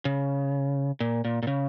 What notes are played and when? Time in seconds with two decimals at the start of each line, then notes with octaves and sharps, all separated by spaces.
0.05 C#3
1.00 A#2
1.25 A#2
1.43 A#2
1.47 C#3